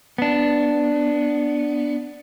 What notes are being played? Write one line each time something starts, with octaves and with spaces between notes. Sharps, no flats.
B3 D4